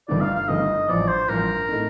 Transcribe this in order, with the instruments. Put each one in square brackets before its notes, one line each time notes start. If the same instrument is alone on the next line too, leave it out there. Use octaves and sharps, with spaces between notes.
[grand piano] G1 G2 D#3 A3 [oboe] D5
[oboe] F5
F5
[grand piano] G1 G2 D#3 A3 [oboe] D#5
[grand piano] A1 G2 F3 [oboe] D5
[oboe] C5
[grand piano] A1 G2 F3 [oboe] A#4
[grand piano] A2 A3 D#4